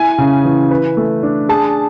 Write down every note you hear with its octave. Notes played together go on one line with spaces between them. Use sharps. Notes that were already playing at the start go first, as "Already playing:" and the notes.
Already playing: E4 G#5
C#3
E3
B4
A3
D4
G#4 A5